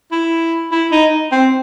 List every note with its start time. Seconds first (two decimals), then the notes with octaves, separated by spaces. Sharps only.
0.12 E4
0.72 E4
0.92 D#4
1.32 C4